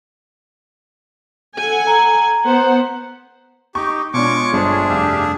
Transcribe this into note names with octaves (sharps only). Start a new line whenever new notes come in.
A4 F#5 G#5
A#5
B3 C5 F#5
D#4 G4 C#6
B2 G#3 D4 F4 C#5 C#6 D6
G1 D4 G#4 C5
F1 G2 G4 E5 F5